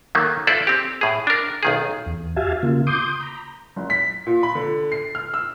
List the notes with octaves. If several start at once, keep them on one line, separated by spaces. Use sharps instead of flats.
D#3 F#3 A3 A#3
E4 F4 A4 B4 C5 D5
C4 G4
A2 G#4
D4 A#4
B1 D#3 G#4
E2
F#4 G4 E5 F5 G#5 A5
C#3 A#3 F4
C6 D6 D#6 G6
A#5 B5
F#1
B6
A#2
B5
D3
C7
F6
E6